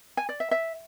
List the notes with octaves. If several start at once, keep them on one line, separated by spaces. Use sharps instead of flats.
G#5
D5
E5
E5